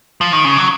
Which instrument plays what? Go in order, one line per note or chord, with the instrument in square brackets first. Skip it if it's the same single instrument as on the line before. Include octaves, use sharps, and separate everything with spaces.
[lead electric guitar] F3
D#3
C#3
F#3